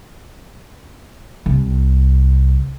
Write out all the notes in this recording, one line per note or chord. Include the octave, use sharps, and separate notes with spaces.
C2 C3